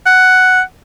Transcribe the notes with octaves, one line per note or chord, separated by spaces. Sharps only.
F#5